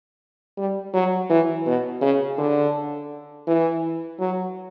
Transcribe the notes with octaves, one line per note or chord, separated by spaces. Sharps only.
G3
F#3
E3
B2
C#3
D3
E3
F#3